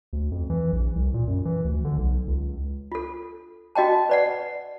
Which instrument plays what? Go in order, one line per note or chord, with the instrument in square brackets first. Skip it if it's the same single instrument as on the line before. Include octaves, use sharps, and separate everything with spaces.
[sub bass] D2
F2
E3
A#1
C2
A#2
F#2
E3
D2
D3
B1
C#2
[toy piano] F4 A4
F#4 D#5 G5 A5
B4 D5 F#5